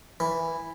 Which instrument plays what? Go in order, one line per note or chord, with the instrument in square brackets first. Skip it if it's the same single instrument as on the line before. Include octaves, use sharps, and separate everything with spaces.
[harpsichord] E3